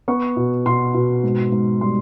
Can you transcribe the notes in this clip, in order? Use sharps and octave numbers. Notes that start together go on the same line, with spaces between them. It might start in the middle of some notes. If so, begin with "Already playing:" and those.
B3 C#6
B2
B2 C6
B2
G#2
G#2
G3 C6